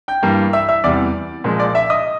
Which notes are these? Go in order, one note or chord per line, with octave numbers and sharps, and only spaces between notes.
G5 G6
G2 E3 G3 A#3
E5 E6
E5 E6
E2 C3 E3 G3 D5 D6
A#2 F3 G#3
D5 D6
E5 E6
D#5 D#6